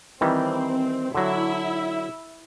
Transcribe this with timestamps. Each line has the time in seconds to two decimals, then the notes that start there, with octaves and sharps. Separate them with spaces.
0.21 D#3 E3 G3 C4
1.15 D3 F#3 E4 E5